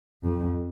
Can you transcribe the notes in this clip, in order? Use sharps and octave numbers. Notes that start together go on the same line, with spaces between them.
F2